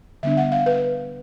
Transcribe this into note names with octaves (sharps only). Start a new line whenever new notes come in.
D3 G3 B3 D4 E5
F#5
F5
B4